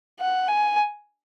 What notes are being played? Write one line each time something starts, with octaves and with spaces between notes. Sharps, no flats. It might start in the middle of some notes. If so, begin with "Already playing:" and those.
F#5
G#5